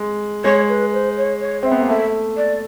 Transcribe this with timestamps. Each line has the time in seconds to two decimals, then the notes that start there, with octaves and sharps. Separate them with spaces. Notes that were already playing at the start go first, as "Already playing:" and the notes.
Already playing: G#3
0.44 G#3 C#5
0.69 B4
0.93 C5
1.17 C#5
1.41 C#5
1.63 C4 E5
1.71 B3
1.80 A#3
1.89 A3 E5
2.37 D5